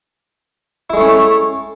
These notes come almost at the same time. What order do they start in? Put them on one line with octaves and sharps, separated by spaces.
E4 G#3 A3 C#4